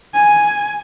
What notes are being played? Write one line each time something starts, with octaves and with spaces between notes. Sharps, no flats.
G#5